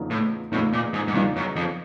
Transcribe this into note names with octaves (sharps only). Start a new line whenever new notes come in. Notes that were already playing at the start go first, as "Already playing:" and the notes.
Already playing: E2 C#3 F3 A#3 D#4
A2
E2 A2 C#3 F3 A#3 D#4
A#2
G#2
G#2
E2 G2 C#3 F3 A#3 D#4
F#2
F2